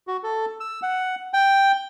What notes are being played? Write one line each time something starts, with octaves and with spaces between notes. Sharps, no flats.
F#4
A4
E6
F#5
G5